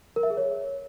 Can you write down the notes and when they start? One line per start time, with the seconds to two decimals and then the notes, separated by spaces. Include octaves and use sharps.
0.16 A#4
0.23 E5
0.30 G#4
0.37 C#5